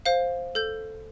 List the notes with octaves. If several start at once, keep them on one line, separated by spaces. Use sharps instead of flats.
C5 F5
A4 G6